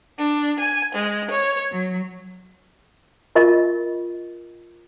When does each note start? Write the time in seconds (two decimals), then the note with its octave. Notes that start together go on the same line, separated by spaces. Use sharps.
0.18 D4
0.58 G#5
0.94 G#3
1.30 C#5
1.71 F#3
3.35 F4 A#4 D#5 C#6